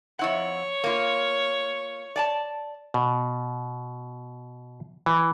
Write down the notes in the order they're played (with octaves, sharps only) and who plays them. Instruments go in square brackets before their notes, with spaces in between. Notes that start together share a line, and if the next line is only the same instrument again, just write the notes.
[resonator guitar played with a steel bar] F2 E4 F#5 [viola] C#5
[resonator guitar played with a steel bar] A#3 F4
D5 G#5 A5
[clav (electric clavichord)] B2
E3